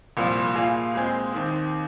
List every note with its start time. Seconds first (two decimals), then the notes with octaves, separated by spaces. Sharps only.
0.17 C2 A#2 F3
0.55 A#2 A#3 F4 G#4
0.94 A#2 G#3 C4 G#4
1.32 D#2 D#3 C4